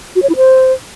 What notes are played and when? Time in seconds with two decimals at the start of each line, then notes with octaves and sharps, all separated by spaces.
0.16 F#4
0.23 C#5
0.29 E4
0.36 C5